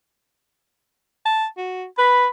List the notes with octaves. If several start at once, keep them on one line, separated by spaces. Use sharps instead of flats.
A5
F#4
B4 B5